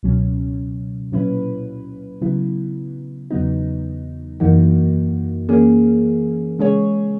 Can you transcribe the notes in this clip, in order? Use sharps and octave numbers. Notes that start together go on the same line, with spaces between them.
C#2 B2 F#3 C#4
A#2 F#3 C#4 E4 B4
C#3 F#3 B3 E4
E2 C#3 F#3 B3 D#4
F#2 E3 A#3 D#4 F#4
E3 A#3 C#4 G#4
C#3 G#3 C#4 G#4 C#5